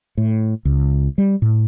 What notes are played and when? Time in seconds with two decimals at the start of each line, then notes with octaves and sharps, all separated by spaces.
0.17 A2
0.65 C#2
1.18 G3
1.42 A2